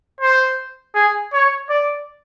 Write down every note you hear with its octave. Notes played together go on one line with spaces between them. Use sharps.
C5
G#4
C#5
D5